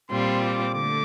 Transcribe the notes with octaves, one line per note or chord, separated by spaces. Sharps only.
A#2 G3 C4 F4 C6
D6
D3 A3 D6